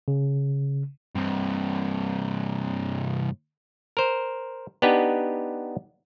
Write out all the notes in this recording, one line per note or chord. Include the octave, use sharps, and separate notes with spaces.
C#3
G2 C3
A#4 C5
B3 D4 D#4 G4 B4